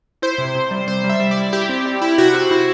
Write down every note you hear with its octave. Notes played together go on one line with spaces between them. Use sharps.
E4 C5
C3
C3
G3
C3 C5
G3
E5
G3
D5
E4
E4 G4
C4
G3
E4
C3 F#4
C4
E4